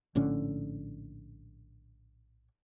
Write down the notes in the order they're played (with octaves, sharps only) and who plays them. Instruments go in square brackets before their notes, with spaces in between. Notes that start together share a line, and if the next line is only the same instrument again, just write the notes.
[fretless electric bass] A#1 A2 D3 C#4